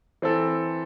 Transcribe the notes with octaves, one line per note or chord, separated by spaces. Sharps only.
E3 C4 A4